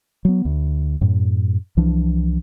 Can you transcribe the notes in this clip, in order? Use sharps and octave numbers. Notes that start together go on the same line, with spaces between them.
F#3 B3
D2
F#2 A2
C2 E3 F3 D4